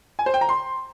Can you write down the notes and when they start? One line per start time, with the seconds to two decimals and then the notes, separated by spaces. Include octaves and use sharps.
0.19 G#5
0.26 C5
0.34 G5
0.41 A#5
0.49 C6